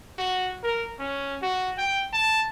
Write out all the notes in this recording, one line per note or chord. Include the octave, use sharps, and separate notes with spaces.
F#4
A#4
C#4
F#4
G5
A5